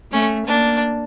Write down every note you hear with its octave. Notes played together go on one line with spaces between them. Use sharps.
A3 C#4
A#3 D4